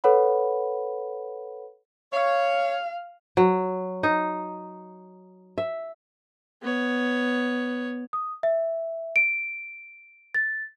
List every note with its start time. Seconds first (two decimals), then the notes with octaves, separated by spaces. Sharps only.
0.04 A4 B4 C#5 F#5 B5
2.13 C#5 F5
3.37 F#3
4.03 D#4
5.58 E5
6.62 B3 C#5
8.13 D#6
8.43 E5
9.16 D7
10.35 A6